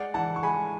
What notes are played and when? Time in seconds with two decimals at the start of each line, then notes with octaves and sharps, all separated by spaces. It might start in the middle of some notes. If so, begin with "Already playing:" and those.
Already playing: G#3 D5 F#5
0.14 E3 F#5 A5
0.36 C#6
0.43 G#3 G#5 B5